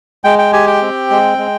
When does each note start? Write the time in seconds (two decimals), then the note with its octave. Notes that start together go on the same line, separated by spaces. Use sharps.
0.24 G#3 G5
0.39 G5
0.53 G4 G#5
0.67 G5
0.82 C4
1.10 G#3
1.38 G#3